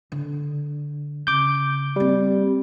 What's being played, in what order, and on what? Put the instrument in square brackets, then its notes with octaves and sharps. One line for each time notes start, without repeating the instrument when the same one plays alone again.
[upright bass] D3
[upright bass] C#3 [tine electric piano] D6 G6
[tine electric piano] G3 [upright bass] A#3 C4